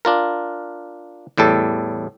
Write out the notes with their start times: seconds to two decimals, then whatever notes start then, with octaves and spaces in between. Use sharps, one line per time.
0.05 D4 F4 A#4
1.38 E2 A2 G3 A4